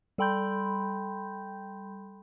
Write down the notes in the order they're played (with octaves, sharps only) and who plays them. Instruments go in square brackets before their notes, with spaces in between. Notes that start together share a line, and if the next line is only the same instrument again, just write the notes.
[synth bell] G3 A4 G5 B5 C6 G6